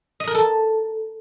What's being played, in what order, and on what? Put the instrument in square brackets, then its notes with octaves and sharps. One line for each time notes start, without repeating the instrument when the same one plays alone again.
[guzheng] D#5
A#4
A4